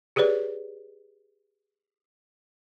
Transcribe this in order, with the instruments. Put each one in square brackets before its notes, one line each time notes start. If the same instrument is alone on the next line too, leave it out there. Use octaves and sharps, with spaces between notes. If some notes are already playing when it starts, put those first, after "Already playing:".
[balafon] G4 G#4 B4 C#5 D5